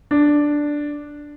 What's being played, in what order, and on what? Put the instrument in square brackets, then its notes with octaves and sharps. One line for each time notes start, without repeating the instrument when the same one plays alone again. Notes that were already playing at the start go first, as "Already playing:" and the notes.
[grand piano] D4